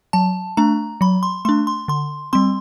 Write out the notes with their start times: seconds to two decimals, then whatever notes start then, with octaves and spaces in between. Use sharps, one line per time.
0.13 F#3 A5
0.57 A3 D4 A#5
1.01 F#3 B5
1.23 C6
1.45 A3 D4 C6
1.67 C6
1.88 D3 C6
2.33 G3 C4 C6